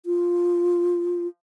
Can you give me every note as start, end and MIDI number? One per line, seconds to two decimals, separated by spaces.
0.06 1.27 65